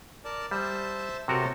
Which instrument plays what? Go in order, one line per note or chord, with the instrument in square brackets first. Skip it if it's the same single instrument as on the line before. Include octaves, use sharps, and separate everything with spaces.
[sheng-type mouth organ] A#4 D5 A5
[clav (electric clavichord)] G3 [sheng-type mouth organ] C5 E5 A5
[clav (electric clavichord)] C3 F#4 A#4 [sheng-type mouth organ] A4 C5 C#5